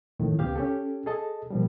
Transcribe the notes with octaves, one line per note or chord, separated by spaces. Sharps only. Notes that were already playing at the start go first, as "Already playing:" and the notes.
F2 A2 D#3
C#2 B3 G4 F5
C#4 G4 A4
G#4 A4 D#5 A5
A#2 F3 G3